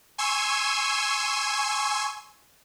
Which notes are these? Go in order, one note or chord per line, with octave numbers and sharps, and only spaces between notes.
G#5 C6 C#6 E6 G#6